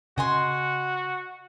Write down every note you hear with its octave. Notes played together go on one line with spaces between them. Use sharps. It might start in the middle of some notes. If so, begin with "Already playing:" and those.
C#3 F#4 D#5 G#5 C6